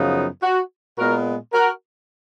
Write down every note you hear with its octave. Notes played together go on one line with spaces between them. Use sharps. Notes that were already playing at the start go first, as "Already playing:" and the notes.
Already playing: F#2 C#3 F3 B3 D#4
F#4
A#2 G#3 B3 F#4 A#4
F#4 A#4